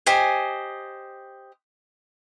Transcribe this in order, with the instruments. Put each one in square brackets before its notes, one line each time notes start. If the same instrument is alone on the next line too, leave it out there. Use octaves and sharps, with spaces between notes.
[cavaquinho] G4 C5 D#5 G#5